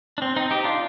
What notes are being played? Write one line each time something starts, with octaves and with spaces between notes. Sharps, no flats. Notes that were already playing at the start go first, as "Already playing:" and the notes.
D4
C4
C4 D#4
D#4 G4
D4 F4